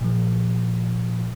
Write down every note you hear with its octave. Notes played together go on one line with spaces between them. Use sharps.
A#2 F3